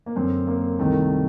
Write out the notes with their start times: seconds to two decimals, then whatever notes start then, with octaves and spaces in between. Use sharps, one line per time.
0.06 A#3
0.15 F#2 D3 C4
0.47 A#3
0.79 C2 C3 D#3 A3